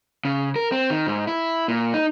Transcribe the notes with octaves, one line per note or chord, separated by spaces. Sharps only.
C#3
A#4
C4
D#3
G#2
E4
A#2
D#4